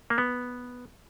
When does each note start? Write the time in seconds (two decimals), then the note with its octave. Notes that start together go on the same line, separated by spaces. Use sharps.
0.10 A#3
0.18 B3